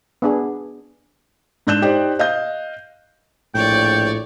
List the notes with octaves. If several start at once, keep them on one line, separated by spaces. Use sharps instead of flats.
B3 D4 G#4
G#2 D4 F#6 G6 E7
D#4 G4 C5 D5
D#5 F5 G6
A#1 A2 C#5 D5 G5